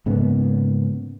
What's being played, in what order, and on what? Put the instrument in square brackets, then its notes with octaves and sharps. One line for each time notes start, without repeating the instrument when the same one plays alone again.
[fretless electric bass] G#2 C#3 A#3 B3